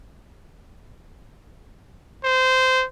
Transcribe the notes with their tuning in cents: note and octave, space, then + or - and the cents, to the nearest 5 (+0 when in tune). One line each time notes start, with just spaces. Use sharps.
C5 -20